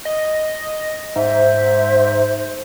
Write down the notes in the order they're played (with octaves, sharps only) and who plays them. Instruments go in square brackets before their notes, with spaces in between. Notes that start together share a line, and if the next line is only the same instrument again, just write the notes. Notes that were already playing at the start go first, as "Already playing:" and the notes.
[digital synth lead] D#5
[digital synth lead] G#2 [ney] C5 [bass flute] E5